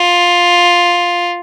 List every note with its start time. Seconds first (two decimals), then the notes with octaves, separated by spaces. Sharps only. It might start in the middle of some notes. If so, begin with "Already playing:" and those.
Already playing: F4